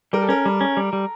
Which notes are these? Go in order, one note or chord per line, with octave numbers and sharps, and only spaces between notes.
G3 A#4
A4
C#4 A#4
G3
C#4
G3
G3